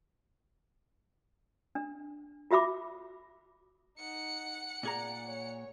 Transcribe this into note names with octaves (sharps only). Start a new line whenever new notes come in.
D4
F4 F#4 E5 B5 D6
D#4 F#5 C#7
A#2 G#4 D5 A#5
C#5